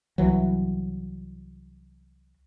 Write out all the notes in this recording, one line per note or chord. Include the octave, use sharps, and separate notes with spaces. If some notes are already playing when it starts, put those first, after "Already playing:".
C2 E3 F#3